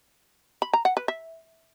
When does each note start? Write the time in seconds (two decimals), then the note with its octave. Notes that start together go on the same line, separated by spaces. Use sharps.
0.62 B5
0.73 A#5
0.85 F#5
0.97 B4
1.08 E5